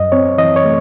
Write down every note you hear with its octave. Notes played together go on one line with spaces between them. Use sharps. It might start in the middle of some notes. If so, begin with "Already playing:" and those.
Already playing: F#2 D#5
C4 C#5
E3 D#5
C#5
A3